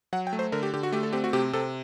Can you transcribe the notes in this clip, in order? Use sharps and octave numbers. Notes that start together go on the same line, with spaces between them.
F#3 F#5
G5
A3
C5
D3 A#4
G4
D3 G4
F#4
A3 G4
A4
C4 G4
F#4
C3 G4
C3 A4